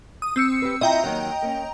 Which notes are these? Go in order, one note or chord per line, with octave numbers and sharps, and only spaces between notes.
D#6
C4 E6 C#7
G4 B4
E4 F4 D#5 E5 G5 A#5
D#2 D#3 F#3
A#3 C#4